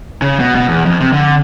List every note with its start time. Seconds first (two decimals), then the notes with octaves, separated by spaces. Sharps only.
0.22 C#3
0.40 B2
0.55 B2
0.69 E2
0.85 F2
1.00 C3
1.13 D3